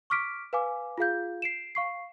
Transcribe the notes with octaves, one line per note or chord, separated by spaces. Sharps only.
C#6 D6 F6 B6 D7
B4 F5 G#5 D6
F4 G#4 F5 G6
C7 D7 E7
F5 C#6 C7